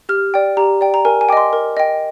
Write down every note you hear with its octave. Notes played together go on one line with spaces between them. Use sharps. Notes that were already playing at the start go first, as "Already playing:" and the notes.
G4 F6
D5 G5
G4 A#5
D5 G5
A#5
A#4 G#5
G#5
D#5 G5 C6 D6
A#4
D#5 G5